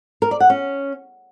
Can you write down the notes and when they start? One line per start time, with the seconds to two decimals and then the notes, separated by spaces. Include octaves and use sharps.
0.22 A#4
0.31 D5
0.40 F#5
0.50 C#4